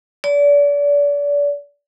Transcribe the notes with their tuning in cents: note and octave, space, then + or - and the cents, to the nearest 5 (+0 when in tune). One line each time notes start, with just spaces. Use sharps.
D5 -35